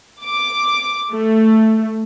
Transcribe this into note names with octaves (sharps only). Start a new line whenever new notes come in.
D6
A3